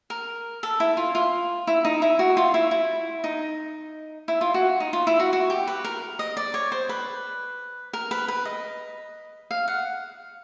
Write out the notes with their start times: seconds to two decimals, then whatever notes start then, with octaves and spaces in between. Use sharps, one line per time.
0.10 A#4
0.63 A4
0.80 E4
0.97 F4
1.15 F4
1.67 E4
1.85 D#4
2.02 E4
2.19 F#4
2.37 F4
2.54 E4
2.71 E4
3.24 D#4
4.28 E4
4.41 F4
4.54 F#4
4.80 D#4
4.93 F4
5.07 E4
5.20 F#4
5.33 F#4
5.50 G4
5.67 B4
5.84 A#4
6.19 D#5
6.37 D5
6.54 C#5
6.72 C5
6.89 B4
7.93 A#4
8.11 B4
8.28 B4
8.45 D#5
9.51 F5
9.68 F#5